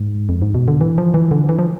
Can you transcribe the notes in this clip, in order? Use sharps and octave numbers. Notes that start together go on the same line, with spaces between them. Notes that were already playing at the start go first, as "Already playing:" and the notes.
Already playing: G#2
F2
G#2
B2
D3
E3
F3
E3
D3
E3
F3